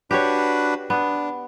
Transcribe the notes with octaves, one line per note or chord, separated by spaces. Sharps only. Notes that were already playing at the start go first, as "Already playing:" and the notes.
D4 F#4 G4 B4 C#5
B3 D4